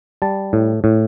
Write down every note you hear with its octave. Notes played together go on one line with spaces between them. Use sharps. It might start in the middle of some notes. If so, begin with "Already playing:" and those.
G3 A5
A2
A2